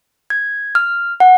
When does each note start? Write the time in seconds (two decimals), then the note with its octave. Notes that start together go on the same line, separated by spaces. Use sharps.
0.30 G#6
0.75 F6
1.20 F#5